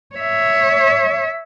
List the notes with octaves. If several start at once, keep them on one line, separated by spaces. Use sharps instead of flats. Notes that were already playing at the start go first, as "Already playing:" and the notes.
C#5 E5